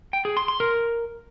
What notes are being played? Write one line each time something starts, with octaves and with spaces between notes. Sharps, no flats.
G5
G#4
C6
C6
A#4